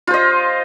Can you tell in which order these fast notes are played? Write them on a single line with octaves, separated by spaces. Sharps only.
F4 C5 D#5